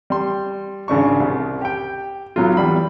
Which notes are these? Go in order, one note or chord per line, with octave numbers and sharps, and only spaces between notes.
G3 C6
G#1 C#3 D4 C#6
C2
G4 G5
B1 F#3 F4
E2 E3 G3 B5